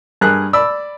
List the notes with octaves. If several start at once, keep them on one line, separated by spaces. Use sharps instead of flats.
G2 G#4 A#4 F#6
D5 B5 E6